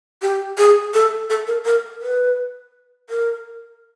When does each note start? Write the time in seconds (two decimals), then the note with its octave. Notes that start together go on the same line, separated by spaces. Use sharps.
0.22 G4
0.58 G#4
0.94 A4
1.30 A4
1.47 A#4
1.65 A#4
2.02 B4
3.10 A#4